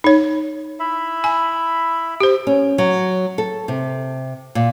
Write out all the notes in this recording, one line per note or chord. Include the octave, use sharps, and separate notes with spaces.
D#4 C#5
E4 E5 B5
G#5
G4 C5
C#4
F#3
A4
C3
A#2